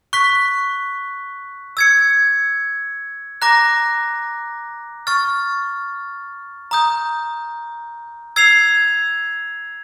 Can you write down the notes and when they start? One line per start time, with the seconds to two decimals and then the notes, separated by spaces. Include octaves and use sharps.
0.13 C#6 F#6 B6
1.77 E6 G#6 C#7
3.42 A#5 D6 F#6 A#6
5.07 C#6 F6 A6
6.71 A#5 D#6 G6
8.36 E6 G#6 C7 F7